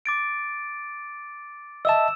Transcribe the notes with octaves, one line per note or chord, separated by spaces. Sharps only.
D6 A6 D7
D#5 E5 A5 E6 E7